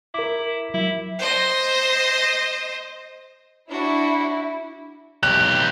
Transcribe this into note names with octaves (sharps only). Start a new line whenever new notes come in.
E4 A#4 D6
F#3 E4
C5 D#5
D4 E4 F#4
B1 G4 F#6